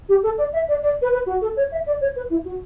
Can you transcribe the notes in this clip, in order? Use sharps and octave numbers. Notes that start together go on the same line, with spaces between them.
G4
A4
D5
E5
D5
D5
B4
B4
F#4
A4
C#5
E5
D5
C#5
B4
E4
F#4